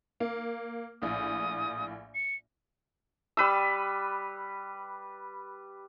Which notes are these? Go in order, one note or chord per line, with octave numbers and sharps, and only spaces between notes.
A#3
A#1 A2 D#6
C#7
G3 B4 E6